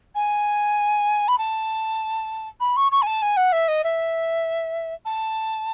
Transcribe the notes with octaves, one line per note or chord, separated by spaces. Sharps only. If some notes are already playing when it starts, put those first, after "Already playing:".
G#5
B5
A5
B5
C#6
C#6
G#5
A5
G#5
F#5
E5
D#5
E5
A5